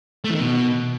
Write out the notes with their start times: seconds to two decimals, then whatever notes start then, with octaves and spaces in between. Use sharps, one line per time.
0.24 A3
0.30 E3
0.35 D#3
0.40 B2